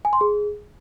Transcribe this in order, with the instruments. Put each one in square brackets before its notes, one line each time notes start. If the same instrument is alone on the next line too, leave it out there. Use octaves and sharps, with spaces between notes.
[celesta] G#5
C6
G#4